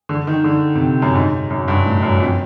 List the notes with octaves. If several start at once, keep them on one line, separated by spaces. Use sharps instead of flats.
D3
D#3
D3
C3
F#2
G#2
F#2
G2
A2
F#2
F2